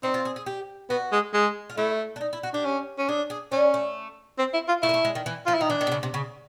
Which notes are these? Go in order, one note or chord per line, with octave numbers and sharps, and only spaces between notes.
C4 D#4
F4
G#4
G#4
G4
B3 F#4
G#3
G#3
F4
A3 E4
D4
D#4
E4
F#4
D4 G4
C#4
C#4
D4 G#4
G#4
C#4 D4
A3
C4
E4
F4
A3 E4
A#3
A3
G#3
D#3
E3
F3 F4
E4
D#3 D#4
E3 D4
D#3
C3
C#3
C3
C#3